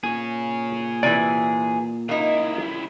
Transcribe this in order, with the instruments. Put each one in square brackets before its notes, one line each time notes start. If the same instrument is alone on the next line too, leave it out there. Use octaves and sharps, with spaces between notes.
[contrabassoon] A#2 [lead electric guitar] G#4 C#5 [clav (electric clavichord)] G#5
[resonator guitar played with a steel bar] C3 E3 [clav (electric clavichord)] D5 G#5
[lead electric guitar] C#2 E4 [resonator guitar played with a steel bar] A#3 D#4